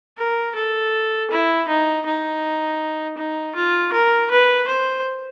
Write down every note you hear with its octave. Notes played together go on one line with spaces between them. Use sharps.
A#4
A4
E4
D#4
D#4
D#4
F4
A#4
B4
C5